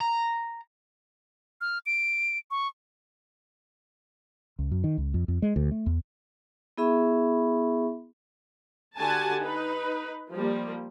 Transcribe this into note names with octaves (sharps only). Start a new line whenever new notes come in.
A#5
F6
D7
C#6
C#2
F#2
D#3
C#2
F2
F2
G#3
D2
A3
E2
B3 E4 G#4 E5 B5 C#6
D3 F#4 G4 F#5 G#5 A5
D#4 B4
F3 G3 A#3